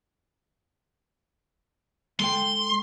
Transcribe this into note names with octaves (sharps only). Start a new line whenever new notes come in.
G#3 A4 G5 C6